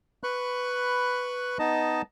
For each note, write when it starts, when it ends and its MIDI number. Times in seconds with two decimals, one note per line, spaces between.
0.24 1.58 71
0.24 1.58 83
0.24 1.58 85
0.24 1.58 90
1.59 2.02 59
1.59 2.02 63
1.59 2.02 75
1.59 2.02 81